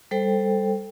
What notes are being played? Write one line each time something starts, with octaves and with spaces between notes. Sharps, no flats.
G3 A4 C5 G5